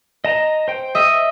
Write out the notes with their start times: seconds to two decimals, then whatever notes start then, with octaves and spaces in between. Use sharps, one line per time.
0.25 D#5 A5 A#5
0.68 C5 G5
0.95 D#5 E5